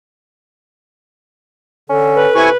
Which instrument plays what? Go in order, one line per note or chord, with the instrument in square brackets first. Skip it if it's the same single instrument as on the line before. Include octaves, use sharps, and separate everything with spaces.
[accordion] D3 [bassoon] C#4 [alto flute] A4
[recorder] B4
[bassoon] C3 [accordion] E4 G#5 C#6